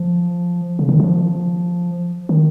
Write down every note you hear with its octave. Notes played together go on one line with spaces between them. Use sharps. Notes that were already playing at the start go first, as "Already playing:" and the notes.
Already playing: F3
C#3
D#3
F3
D#3